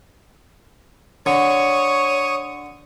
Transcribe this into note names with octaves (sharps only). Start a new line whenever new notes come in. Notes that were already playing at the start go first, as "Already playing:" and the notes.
D3 C#5 C#6 D#6